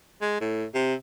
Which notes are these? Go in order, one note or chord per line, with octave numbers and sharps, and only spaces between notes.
G#3
A2
C3